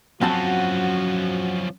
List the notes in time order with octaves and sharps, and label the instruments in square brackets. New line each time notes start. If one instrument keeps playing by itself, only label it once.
[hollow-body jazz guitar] F#2 C4 A5 [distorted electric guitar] F3 C#4 [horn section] F#4